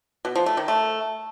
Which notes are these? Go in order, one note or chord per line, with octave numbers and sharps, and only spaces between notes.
B2
F3
A3
D#3
A3